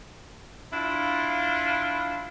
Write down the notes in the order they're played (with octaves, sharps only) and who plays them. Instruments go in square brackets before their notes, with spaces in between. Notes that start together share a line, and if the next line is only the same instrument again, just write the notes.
[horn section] D4 E4 F4